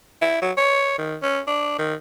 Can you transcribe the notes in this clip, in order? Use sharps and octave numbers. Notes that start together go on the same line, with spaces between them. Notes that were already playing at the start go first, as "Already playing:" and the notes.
E4
F#3
C#5
D#3
C#4
D4
D#3